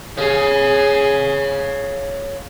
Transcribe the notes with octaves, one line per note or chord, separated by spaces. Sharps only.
G#4 C#5 F5